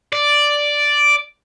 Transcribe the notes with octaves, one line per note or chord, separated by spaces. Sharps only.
D5